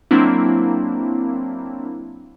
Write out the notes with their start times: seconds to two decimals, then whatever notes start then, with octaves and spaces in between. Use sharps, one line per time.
0.11 F#3 A#3 C4 D4 E4